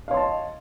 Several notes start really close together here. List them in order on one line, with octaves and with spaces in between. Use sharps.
F5 C#5 C6 A5 D#5